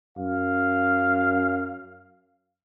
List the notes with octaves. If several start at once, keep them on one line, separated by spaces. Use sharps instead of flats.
F#2 F5